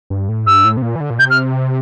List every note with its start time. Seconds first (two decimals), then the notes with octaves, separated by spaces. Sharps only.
0.10 G2
0.29 A2
0.46 G2 E6
0.65 A2
0.77 C3
0.82 A#2
0.96 E3
1.00 D3
1.10 A#2
1.19 C3 G6
1.30 F6